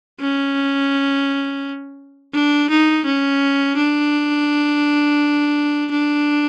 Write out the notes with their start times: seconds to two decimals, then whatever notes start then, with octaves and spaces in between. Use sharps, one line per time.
0.21 C#4
2.33 D4
2.70 D#4
3.05 C#4
3.76 D4
5.91 D4